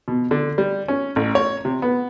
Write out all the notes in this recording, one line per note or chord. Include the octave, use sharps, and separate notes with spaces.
B2
D3
G3
C#4
A1
C#5
C3
B3